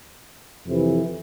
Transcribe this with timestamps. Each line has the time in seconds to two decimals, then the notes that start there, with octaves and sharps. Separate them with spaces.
0.65 F2 C3 E3